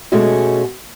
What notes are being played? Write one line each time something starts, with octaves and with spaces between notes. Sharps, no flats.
B2 G#3 A3 C#4 F#4